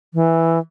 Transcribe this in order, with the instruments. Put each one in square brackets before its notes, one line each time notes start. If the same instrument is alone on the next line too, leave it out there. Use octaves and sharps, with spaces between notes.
[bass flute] E3